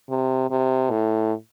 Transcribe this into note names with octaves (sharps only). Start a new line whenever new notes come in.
C3
C3
A2